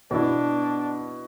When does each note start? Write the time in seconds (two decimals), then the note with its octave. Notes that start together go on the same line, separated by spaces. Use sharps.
0.11 B2 B3 D4 E4